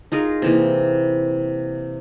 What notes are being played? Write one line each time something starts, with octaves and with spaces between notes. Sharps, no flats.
D#4 F4 G#4 A#4
C3 E3 A#3